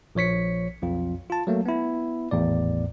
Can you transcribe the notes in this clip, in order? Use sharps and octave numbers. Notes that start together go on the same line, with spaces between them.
A#1 F3 C#5 B6 C#7
B1 F2 F4
F4 A5
F#3 A3 A#3
B3 E4
G#1 E2 A2 D5